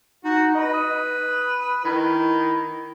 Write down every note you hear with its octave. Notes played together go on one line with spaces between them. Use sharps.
D#4 F#4
B4 D#5
D#6
D#3 E4